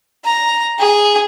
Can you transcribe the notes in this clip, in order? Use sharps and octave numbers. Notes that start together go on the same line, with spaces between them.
A#5
G#4